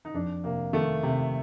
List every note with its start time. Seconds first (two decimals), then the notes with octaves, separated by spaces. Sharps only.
0.05 D#4
0.14 F2 D4
0.44 C3 A#3
0.73 D#3 A3
1.03 C3